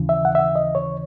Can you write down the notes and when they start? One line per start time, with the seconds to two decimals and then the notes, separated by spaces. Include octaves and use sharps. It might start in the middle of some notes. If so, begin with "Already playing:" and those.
Already playing: D#2 C#3 E3
0.09 E5
0.25 F#5
0.35 E5
0.56 D#5
0.75 C#5